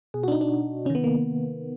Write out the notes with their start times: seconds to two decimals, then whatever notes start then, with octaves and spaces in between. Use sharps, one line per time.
0.14 B2 G#4
0.23 F#4
0.28 D4
0.32 D#4
0.41 D4
0.85 C3 D#3 C#4
0.95 B3
1.04 A#3